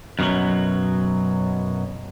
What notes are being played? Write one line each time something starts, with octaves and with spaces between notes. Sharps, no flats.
F#2 B2 D#3 F#3